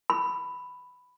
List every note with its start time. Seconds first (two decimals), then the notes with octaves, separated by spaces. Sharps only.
0.10 B5